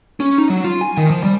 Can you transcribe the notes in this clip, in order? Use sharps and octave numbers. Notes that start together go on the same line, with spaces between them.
C#4
D#4
F#3
F4
G#5
D#3
F3
G3